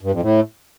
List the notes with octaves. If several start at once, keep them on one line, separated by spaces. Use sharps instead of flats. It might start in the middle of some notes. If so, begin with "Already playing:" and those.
G2
F2
A2